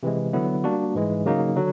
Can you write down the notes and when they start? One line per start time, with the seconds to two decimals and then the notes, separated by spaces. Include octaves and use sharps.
0.03 C3 E3 G#3
0.33 D3 F#3 B3 E4
0.64 G3 A#3 D4 F#4
0.95 G#2 E3 G#3
1.26 C#3 F#3 A#3 D#4
1.56 D3 F#3